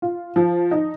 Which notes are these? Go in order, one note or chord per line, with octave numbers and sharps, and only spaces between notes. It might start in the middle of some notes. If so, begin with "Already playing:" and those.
F4
F3
D#4